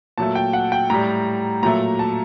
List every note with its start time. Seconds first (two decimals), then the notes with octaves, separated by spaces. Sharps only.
0.18 A#2 F#3 A3 A5
0.35 G5
0.53 F#5
0.72 G5
0.90 A2 G3 A#5
1.63 A#2 F#3 A3 A#5
1.99 A5